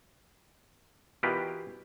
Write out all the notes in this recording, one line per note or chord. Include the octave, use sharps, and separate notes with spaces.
B2 E3 F4 G4 A#4 B4